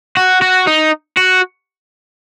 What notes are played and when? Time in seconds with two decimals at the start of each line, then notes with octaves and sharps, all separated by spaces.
0.17 F#4
0.42 F#4
0.67 D#4
1.17 F#4